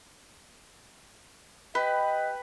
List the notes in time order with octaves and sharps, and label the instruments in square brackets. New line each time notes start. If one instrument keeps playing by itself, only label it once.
[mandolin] G4 [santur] B4 [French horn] D#5